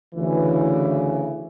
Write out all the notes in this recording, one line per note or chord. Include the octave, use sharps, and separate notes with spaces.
D2 C#3 E3